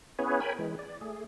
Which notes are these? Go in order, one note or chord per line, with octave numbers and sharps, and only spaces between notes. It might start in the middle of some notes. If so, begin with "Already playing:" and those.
B3 C#4 E4 G#4 B4 C#5
A#4 C#5 G5 G#5 B5
E3 G#3
D5
A3 G#4